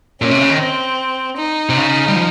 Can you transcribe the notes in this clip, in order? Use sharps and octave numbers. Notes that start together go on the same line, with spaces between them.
A#2 C#4
C3
C#3
D#3
C4
D#4
C3
C#3
G3
F3